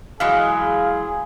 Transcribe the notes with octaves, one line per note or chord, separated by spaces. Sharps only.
E3 F#3 G#3 G#4 F5